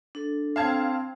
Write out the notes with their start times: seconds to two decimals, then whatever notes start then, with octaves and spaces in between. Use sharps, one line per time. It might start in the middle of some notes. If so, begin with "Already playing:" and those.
0.15 D4 A4
0.56 C4 F5 A5 G#6